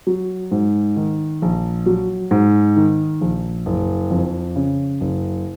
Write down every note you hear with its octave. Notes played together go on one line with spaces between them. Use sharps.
F#3
G#2
D#3
A#1
F#3
G#2
D#3
A#1
F#1
F2
C#3
F#1